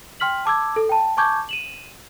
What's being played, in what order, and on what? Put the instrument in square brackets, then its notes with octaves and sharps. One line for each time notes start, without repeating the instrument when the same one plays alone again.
[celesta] G5 C6 F6 B6 F#7
A5 D6 E6 G#6
A4
G5 A5
G#5 A5 C#6 D6 G6 G#6
D#7 E7 F#7